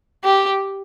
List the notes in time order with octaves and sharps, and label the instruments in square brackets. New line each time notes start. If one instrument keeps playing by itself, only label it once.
[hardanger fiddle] G4